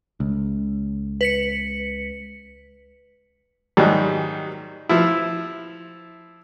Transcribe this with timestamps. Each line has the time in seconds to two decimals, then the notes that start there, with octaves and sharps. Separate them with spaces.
0.20 C#2
1.21 B4 B6 C#7
3.77 G#2 D#3 F#3 G3
4.89 F3 E4